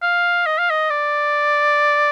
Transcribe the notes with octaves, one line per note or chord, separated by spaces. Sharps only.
F5
D#5
F5
D#5
D5